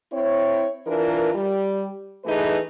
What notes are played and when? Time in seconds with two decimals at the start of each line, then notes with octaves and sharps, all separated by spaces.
0.12 C4 E4 C#5
0.87 E3 D4 F4 A#4
1.34 G3
2.25 E3 A3 D#4 G#4 B4